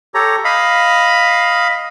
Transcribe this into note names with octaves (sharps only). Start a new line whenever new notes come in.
G4 A4 C#5 A#5
D#5 F5 B5